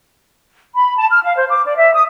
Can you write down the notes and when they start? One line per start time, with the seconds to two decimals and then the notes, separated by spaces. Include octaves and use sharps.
0.75 B5
0.97 A5
1.11 F6
1.25 F5
1.36 C5
1.50 D6
1.65 D5
1.77 E5
1.94 D#6